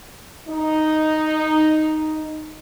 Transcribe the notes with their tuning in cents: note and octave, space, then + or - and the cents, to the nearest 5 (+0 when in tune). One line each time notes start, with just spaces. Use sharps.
D#4 +0